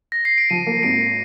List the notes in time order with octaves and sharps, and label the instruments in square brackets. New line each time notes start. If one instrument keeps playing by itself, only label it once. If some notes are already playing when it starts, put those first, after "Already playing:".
[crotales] A#6
C7
D7
[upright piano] F3 [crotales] D#7
[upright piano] A#3
[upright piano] G#1 [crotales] D7